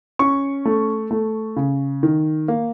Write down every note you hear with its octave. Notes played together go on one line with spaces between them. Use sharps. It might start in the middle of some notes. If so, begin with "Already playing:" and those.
C#4 C#6
A3
A3
C#3
D#3
A#3